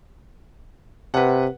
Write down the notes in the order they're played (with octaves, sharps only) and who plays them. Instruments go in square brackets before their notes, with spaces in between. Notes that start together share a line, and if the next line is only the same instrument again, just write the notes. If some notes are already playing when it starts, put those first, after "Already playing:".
[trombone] C3 [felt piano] B4 F#5